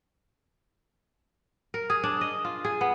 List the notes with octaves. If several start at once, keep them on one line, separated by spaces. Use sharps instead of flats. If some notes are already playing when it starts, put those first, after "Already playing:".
A#4
G#4
D4
D#5
F4
G#4
B3